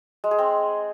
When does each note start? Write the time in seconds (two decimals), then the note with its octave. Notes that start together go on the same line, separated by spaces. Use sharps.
0.24 G#3
0.31 G#4
0.39 C4